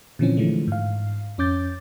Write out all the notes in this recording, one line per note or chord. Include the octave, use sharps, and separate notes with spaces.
A#2 D3 E3 F3 C4 C#4
D3 E3 F3 G#3 A3
G#2 F5
F2 C#4 D6 G6 A6